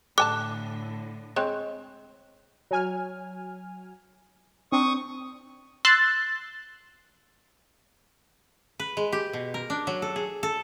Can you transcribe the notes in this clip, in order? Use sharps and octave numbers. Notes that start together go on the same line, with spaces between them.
A2 D3 A4 G#5 A5 D6 F#6
G#3 C4 C#5
F#3 G#5 F6
C4 D4 C#6 D#6
C6 E6 F#6 A6
B4
G#3
G4
B2
A#4
D4
F#3
A4
G#4
A4